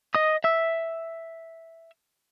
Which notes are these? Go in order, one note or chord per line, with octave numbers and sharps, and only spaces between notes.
D#5 D#6
E5 E6